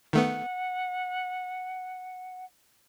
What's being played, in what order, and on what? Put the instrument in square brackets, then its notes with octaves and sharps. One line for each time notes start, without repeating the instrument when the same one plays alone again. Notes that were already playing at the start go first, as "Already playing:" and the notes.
[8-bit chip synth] D#3 A3 B3 [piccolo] F#5